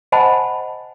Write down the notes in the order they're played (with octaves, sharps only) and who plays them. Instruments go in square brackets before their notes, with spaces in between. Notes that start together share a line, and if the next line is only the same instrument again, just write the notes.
[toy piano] C5 D#5 F#5 G#5 A5 B5